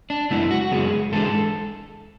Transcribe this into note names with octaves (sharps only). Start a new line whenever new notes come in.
D4
F#2 C#3 G#3 B3 E4
F#4
F#4
F#2 C#3 G#3 B3 G#4
G#2 E3 G#3 D4 A4